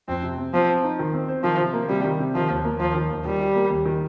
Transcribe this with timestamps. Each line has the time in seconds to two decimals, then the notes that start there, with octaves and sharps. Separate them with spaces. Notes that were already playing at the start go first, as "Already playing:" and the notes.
0.08 F2 C4
0.23 C3
0.38 C4
0.54 F3 C4
0.68 C5
0.84 D#4
0.99 D#3
1.14 C4
1.28 C5
1.44 D#3 F3
1.59 C3
1.74 A#3
1.89 C3 G3
2.05 D#3
2.19 C3
2.35 D#3 F3
2.50 D#2
2.65 A#3
2.79 D#2 F3
2.95 D#3
3.10 D#2
3.25 D#3 G3
3.40 G4
3.55 A#3
3.70 D#2
3.86 D#3